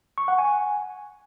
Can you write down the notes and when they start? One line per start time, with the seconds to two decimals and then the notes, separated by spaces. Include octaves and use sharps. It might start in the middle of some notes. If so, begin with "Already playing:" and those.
0.18 C#6
0.28 F#5
0.38 G#5